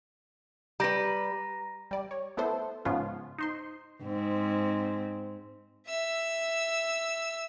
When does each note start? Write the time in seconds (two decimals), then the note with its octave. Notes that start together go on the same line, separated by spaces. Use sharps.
0.80 G3 B4 A#5 A#6
1.91 G3 D5
2.11 C#5
2.37 A3 B3 E4 A4 C5
2.85 G#2 C#3 F3 B3 C#4 F4
3.38 D#4 C5 C6
4.04 G#2 C4
5.87 E5 E6